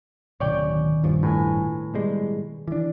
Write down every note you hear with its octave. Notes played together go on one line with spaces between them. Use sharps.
D1 B2 D#3 C#4 C#5 D5 G5
D#1 G2 F3
A2 A#4 B4 G#5
B2 G3 G#3
E3 D4